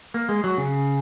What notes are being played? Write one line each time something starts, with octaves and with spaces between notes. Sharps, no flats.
A#3
G#3
F#3
C#3